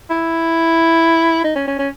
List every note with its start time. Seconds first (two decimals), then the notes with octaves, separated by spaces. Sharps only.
0.10 E4
1.44 D#4
1.55 C#4
1.67 C#4
1.79 C#4